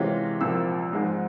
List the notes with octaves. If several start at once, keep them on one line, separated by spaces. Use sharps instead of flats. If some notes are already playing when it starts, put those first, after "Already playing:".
Already playing: C3 E3 G#3 C#4 F4
C2 A#2 F3 E6
G#2 F3 G#3